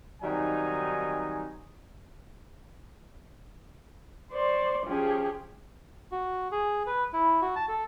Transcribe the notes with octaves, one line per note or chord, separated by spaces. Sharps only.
D#3 F#3 G3 C4 D#4 G#5
C5 D5 C6 C#6
F3 C#4 G4 G#4
F#4
G#4
B4
E4
F#4
A5
A4